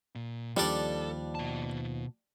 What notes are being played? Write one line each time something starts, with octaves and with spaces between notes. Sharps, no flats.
A#2
D#2 F3 G3 D4 A4 D5
B2 A5